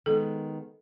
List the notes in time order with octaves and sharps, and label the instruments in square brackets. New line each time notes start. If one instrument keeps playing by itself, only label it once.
[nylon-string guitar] D#3 G#3 B3 [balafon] A4